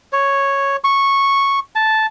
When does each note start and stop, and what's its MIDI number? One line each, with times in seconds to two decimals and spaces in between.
0.13 0.76 73
0.84 1.59 85
1.75 2.06 81